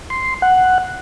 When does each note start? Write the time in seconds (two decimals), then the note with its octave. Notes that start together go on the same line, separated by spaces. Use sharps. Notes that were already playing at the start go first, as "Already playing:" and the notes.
0.10 C6
0.42 F#5